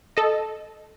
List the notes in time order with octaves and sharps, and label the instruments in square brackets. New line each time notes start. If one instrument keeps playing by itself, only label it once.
[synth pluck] A4 D#5